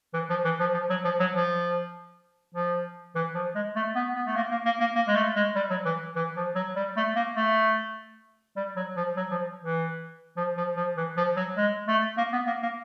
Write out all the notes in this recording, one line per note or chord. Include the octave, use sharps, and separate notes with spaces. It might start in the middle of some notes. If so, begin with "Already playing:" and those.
E3
F3
E3
F3
F3
F#3
F3
F#3
F3
F3
E3
F3
G#3
A3
B3
B3
A3
A#3
A#3
A#3
A#3
A#3
G#3
A3
G#3
G3
F#3
E3
E3
F3
F#3
G3
A3
A#3
A3
G3
F#3
F3
F#3
F3
E3
F3
F3
F3
E3
F3
F#3
G#3
A3
A#3
B3
A#3
A#3